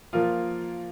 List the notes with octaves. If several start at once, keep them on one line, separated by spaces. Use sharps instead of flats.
F3 A#3 F4